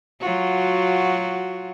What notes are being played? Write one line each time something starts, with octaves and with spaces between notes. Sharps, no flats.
F#3 F4 F#4